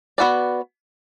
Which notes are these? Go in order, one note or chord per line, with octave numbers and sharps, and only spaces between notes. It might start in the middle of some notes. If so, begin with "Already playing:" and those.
B3 F#4 B4 D5